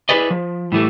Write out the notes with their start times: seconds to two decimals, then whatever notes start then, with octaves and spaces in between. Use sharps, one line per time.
0.09 E4 F4 G#4 B4 D5 D#5
0.30 F3
0.72 A2 E3 G3 A3